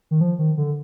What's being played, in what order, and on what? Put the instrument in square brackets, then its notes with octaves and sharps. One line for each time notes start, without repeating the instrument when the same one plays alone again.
[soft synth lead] D#3
F3
D#3
D3